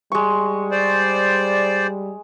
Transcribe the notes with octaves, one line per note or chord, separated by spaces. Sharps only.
G3 G#3 C#6
C5 D5